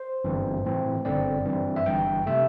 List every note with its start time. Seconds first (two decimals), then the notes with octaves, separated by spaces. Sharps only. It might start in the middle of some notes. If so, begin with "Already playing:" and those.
Already playing: C5
0.25 G1 G2 E3 C4
0.65 A2 E3 C4
1.05 G1 G2 D3 C4 D5
1.46 G2 E3 C4
1.76 E5
1.86 G1 G2 E3 G5
2.26 C3 A3 E5